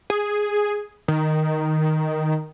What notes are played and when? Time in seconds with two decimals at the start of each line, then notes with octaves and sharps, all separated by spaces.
0.10 G#4
1.08 D#3